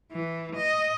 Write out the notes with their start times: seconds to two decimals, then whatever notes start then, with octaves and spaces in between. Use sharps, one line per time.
0.12 E3
0.55 D#5